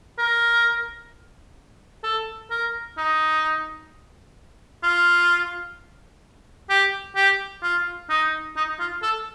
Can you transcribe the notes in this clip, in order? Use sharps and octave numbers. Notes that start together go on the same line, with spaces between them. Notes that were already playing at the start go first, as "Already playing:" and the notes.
A#4
A4
A#4
D#4
F4
G4
G4
F4
D#4
D#4
F4
A4